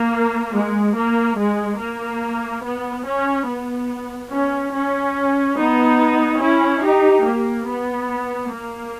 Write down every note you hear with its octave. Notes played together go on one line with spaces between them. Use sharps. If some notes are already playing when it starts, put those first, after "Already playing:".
Already playing: A#3
G#3
A#3
G#3
A#3
B3
C#4
B3
C#4
C#4
B3 D#4
C#4 E4
D#4 G4
A#3
B3
A#3